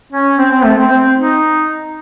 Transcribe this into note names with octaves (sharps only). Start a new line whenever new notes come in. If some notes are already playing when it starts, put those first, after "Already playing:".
C#4
C4
C4
A3
C4
C4
D#4